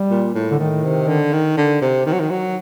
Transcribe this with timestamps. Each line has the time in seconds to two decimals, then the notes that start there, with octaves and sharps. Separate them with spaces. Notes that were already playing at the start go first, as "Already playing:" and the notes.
Already playing: G3
0.11 A#2
0.35 A2
0.51 D3
0.59 A2 D#3
0.84 C3
1.08 D3
1.33 D#3
1.57 D3
1.81 C3
2.06 D#3
2.12 F#3
2.19 D#3
2.30 F#3